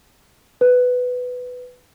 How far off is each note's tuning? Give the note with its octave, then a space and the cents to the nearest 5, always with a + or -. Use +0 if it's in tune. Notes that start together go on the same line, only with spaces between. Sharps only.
B4 +10